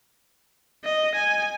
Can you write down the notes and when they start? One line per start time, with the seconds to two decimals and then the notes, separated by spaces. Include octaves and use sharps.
0.84 D#5
1.15 G#5